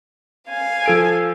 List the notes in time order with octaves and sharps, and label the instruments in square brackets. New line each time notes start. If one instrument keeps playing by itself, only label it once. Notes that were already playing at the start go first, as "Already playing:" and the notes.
[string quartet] F5 G#5
[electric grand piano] F3 A4 D7